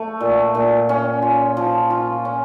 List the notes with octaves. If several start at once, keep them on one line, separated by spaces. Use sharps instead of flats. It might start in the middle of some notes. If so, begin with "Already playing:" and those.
Already playing: A3
A#2
A#2
C#4
F4
F3
F4
C#4